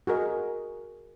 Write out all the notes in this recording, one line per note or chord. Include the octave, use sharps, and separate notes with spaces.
F#4 G#4 A#4 D#5